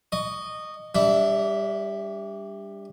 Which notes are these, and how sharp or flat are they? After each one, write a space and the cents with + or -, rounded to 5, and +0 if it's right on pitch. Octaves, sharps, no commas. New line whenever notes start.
D#5 -15 C#6 +20
G3 +20 D4 -30 E5 +0